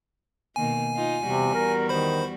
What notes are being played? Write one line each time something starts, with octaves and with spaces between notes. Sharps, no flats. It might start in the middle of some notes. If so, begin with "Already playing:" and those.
B2 D#3 A#3 G#5
D#4 F4
E2 C3 G3 F#4
A#4
D#3 C5 B5